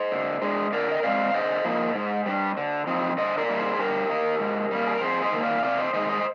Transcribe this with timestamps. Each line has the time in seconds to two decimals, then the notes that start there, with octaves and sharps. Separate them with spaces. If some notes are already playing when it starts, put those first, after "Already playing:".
Already playing: C5 D#5
0.11 D3
0.42 G#3 D4
0.72 D3 A#4 D5
0.92 D#5
1.03 G#3 C4 D5 F5
1.34 D3 C5 D#5
1.65 F3 A#3 D#4
1.96 G#2
2.26 G3 D4
2.57 D3
2.87 F3 C4 D#4
3.18 D3 C5 D#5
3.38 A#4 D5
3.48 G3 A#3 D#4
3.58 G#4 C5
3.79 G2 G4 A#4
4.10 D#3 A#3 D#4
4.40 G#2
4.71 G3 A#3
4.87 G#4
4.94 A#4
5.01 F2 G#4 C5
5.22 C5 D#5
5.32 D#3 A#3
5.43 D5 F5
5.63 C3 D5 F5
5.78 C5 D#5
5.94 D#3 G#3 D#4 C5 D#5
6.09 C5 D#5